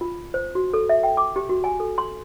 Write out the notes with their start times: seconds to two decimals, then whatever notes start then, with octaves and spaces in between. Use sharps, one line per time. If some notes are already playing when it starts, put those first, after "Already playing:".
0.01 F4
0.34 C5
0.55 F#4
0.74 A4
0.89 E5
1.03 G5
1.17 D6
1.36 G4
1.49 F#4
1.64 G#5
1.80 A4
1.98 C6